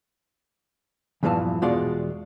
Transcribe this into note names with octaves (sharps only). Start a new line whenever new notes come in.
E2 G2 A#2 E3 F3 A5
E2 B2 G#3 F4 F#4 D5